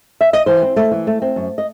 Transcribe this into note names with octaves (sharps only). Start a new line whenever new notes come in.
E5
D#5
E3 C5
C4
A3
E3
A3
C4
F#2
D#5